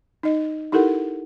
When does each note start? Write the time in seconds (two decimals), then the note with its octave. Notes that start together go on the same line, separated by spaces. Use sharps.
0.23 D#4 D#5
0.72 D#4 E4 G4 A4 A#4 F#5